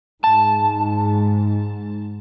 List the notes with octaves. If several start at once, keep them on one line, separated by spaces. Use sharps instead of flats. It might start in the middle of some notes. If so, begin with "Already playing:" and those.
G#2 A5